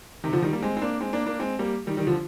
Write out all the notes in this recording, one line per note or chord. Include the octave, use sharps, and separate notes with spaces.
C3 D#3
D3 F3
D#3 G3
G3 A#3
G#3 C4
C4
A#3 D4
G#3 C4
A#3 D4
A#3 D4
G#3 C4
G3 A#3
D#3 G3
D#3 G3
D3 F3